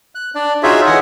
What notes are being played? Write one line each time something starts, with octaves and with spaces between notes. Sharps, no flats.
F#6
D4 D5
D#4 F4 F#4 G#4 C#5 E5
D3 E3 D#5 F#5 G#5 D#6